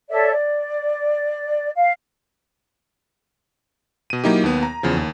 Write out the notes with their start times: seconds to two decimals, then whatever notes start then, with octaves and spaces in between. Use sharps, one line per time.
0.10 A4 C#5 D5 E5
0.32 D5
1.75 F5
4.10 B2 D#7
4.24 F#3 A#3 D#4 E4 G4
4.44 D#2 B3
4.63 A#5
4.83 E2 C#3 F3
4.97 D#2